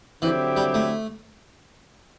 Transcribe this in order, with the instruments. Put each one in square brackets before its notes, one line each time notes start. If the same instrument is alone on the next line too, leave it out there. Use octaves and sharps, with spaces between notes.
[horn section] D3 F#3 C4 E4 G4 [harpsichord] E3
[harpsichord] G3
A3